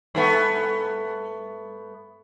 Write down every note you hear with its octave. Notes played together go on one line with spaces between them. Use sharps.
G2 A3 B3